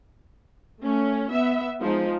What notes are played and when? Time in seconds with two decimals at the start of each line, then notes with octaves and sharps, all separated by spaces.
0.82 A3 C#4
1.30 B3 E5
1.81 F3 G#3 D#4